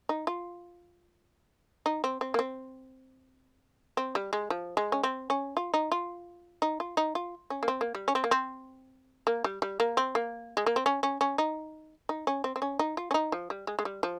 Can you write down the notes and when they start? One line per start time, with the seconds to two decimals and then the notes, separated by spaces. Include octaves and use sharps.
0.09 D#4
0.27 F4
1.86 D#4
2.04 C4
2.21 C4
2.34 A#3
2.39 C4
3.97 C4
4.15 G3
4.33 G#3
4.50 F3
4.77 G#3
4.92 C#4
5.03 C4
5.30 C#4
5.57 F4
5.74 D#4
5.92 F4
6.62 D#4
6.80 F4
6.97 D#4
7.15 F4
7.50 C#4
7.63 A#3
7.68 C4
7.81 A#3
7.95 G3
8.08 C#4
8.15 C4
8.24 A#3
8.31 C4
9.27 A#3
9.44 G3
9.62 G3
9.80 A#3
9.97 C4
10.15 A#3
10.57 G#3
10.66 A#3
10.76 C4
10.86 C#4
11.03 C#4
11.21 C#4
11.38 D#4
12.09 D#4
12.27 C#4
12.44 C4
12.56 C4
12.62 C#4
12.79 D#4
12.97 F4
13.11 C#4
13.14 D#4
13.32 F3
13.50 G3
13.67 G#3
13.79 G#3
13.85 G3
14.03 F3